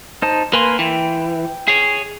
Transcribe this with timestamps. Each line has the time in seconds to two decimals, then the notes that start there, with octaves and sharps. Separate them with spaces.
0.22 D#4 C5 A5
0.53 A#3 B4 G#5 C6
0.79 E3 G5
1.68 G#4 C#5